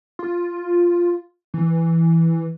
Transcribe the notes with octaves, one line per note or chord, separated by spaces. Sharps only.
F4
E3